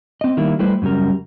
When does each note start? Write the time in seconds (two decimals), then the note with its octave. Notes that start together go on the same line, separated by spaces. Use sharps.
0.21 C4 D#5
0.37 D#3 G3 A#3 E4
0.59 G3 A3 E4 B4 C5
0.82 F#2 C#3 G3 A#4